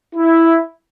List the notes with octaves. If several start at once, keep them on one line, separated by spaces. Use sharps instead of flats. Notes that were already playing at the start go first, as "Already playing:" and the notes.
E4